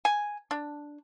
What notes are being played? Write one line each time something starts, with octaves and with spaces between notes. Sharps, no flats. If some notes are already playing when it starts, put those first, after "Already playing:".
G#5
D4